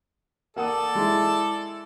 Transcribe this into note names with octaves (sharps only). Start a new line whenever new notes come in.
A#3 A4 D5 F#5 D#6
G#3 E4